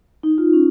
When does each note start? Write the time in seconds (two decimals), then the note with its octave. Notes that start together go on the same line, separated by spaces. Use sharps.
0.23 D#4
0.38 F4
0.53 C#4